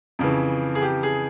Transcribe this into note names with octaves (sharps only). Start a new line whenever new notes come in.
F2 C#3 E3
G#4
G4
G#4